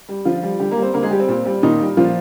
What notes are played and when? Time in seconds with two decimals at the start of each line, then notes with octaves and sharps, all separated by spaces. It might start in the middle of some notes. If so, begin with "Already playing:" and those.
0.09 G3
0.25 D3 F3 F4
0.43 G3
0.59 D3 G3 G4
0.71 A#3 A#4
0.77 G3
0.82 C4 C5
0.94 D3 A#3 A#4
1.02 G#3 G#4
1.11 G3 G4
1.20 C4
1.28 A#2
1.45 G3
1.63 A#2 D#3 D#4
1.80 G3
1.97 A#2 F3 F4